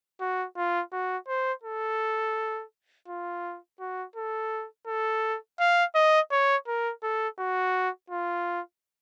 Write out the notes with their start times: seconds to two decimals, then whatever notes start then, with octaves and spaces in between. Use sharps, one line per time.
0.21 F#4
0.57 F4
0.93 F#4
1.28 C5
1.64 A4
3.08 F4
3.80 F#4
4.16 A4
4.87 A4
5.60 F5
5.95 D#5
6.32 C#5
6.67 A#4
7.03 A4
7.39 F#4
8.10 F4